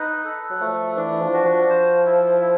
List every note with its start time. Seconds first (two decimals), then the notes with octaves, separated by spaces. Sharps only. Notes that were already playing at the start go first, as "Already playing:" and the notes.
Already playing: D#4 B4
0.24 A4
0.50 F#3
0.60 F3 A3
0.96 E3 D4
1.21 F3
1.33 F#4
1.45 F3
1.69 C5
2.05 E4
2.41 E4